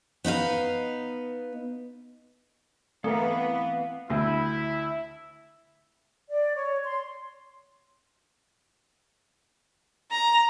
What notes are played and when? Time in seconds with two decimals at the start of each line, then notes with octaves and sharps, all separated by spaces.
0.25 B3 D#4 B4 F5
3.04 E3 A3 B3 C4 A#4 F5
4.10 D2 E4
6.30 D5
6.55 C#5
6.85 C6
10.11 A#5